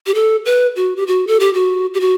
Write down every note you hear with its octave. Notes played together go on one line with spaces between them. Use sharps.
G4
A4
B4
F#4
G4
F#4
A4
G4
F#4
G4
F#4